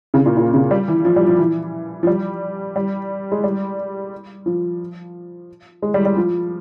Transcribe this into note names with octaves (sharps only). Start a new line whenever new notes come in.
C#3
A#2
A#2
C#3
G3
E3
F3
G3
F3
E3
F3
G3
G3
G#3
G3
F3
G#3
G3
G3
F3